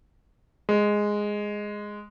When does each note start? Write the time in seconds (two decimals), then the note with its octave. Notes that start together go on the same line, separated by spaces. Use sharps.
0.69 G#3